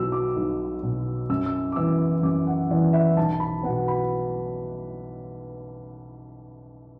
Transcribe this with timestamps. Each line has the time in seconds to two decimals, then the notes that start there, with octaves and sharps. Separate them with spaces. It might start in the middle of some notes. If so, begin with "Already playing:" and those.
Already playing: B1 B2 F#3 E6
0.12 D6
0.36 B1
0.82 B2 F#3
1.30 F#2 E6
1.46 E6
1.72 D6
1.76 E3 B3 E6
2.23 F#2 D6
2.47 F#5
2.70 E3 B3 D5
2.93 E5
3.17 B1 A5
3.33 A5
3.40 B5
3.63 B2 B3 F#5
3.88 B5